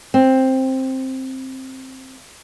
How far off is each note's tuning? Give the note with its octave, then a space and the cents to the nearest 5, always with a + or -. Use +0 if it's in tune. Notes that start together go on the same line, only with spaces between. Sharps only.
C4 +10